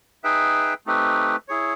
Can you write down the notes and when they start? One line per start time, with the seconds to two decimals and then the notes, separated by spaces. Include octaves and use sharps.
0.24 D#4 G#4 B4 E5 G5
0.86 A3 C4 D#4 G4 B4
1.48 E4 G#4 C#5